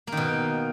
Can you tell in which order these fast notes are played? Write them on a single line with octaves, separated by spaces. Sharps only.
A#3 D#3 B2